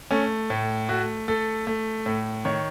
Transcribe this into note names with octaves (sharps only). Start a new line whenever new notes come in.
A3 C#4
A2
A3 F#4
A3 A4
A3
A2
D#3 C#5